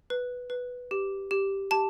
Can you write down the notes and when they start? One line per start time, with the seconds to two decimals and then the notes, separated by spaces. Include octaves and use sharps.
0.10 B4
0.50 B4
0.91 G4
1.31 G4
1.71 G4 A5